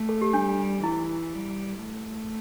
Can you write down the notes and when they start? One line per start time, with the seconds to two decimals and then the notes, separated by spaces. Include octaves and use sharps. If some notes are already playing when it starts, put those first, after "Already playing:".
Already playing: A3
0.09 A4
0.21 G4
0.33 G3 D4
0.83 E3 E4
1.34 G3
1.82 A3